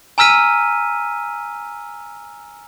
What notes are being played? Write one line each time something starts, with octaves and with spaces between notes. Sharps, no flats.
G#5 A#5 E6 F6 B6 D#7